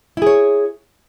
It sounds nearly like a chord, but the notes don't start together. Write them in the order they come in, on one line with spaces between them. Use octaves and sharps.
E4 G#4 C#5